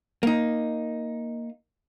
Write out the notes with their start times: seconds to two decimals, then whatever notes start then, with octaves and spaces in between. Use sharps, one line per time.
0.23 A#3 D#4